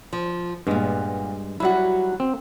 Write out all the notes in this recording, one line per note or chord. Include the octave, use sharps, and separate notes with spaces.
F3
G2 A#2 G#3 B3
F#3 G3 E4 F#4 E5
C4